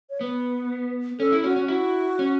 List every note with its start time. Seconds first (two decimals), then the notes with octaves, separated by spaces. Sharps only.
0.10 C#5
0.21 B3 B4
1.19 C#4 A4
1.32 E4
1.44 C#4 F#4
1.56 C#4
1.68 E4 F#4
2.19 C#4